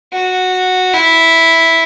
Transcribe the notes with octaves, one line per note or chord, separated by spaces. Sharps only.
F#4
E4